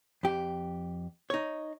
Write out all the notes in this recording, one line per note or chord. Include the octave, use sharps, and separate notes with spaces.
F2 G4
D#4 C#5